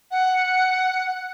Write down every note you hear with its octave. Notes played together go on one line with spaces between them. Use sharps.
F#5